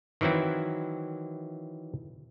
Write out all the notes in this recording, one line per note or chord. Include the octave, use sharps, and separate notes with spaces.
D#3 E3 F#3 C4 E4